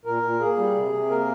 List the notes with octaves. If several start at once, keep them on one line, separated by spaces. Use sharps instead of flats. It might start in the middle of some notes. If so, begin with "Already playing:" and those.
A#2 A#4
A#2
A#3 G#4
G3
C3
C3
A#3 A#4